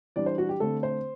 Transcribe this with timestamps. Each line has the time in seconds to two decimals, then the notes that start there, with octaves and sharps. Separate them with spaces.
0.16 E3 G3 D4 D5
0.26 C5
0.38 F#4
0.49 G4
0.60 D3 A3 C4 A4
0.83 C5